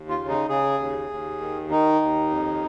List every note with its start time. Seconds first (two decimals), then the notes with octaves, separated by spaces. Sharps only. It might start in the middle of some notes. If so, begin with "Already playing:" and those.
Already playing: D#2
0.09 F4
0.19 C#3
0.28 D#4
0.49 C#3 G#4
0.79 D#2
1.10 D#2
1.40 D#3
1.70 D#3 D#4
2.01 D#2
2.31 F2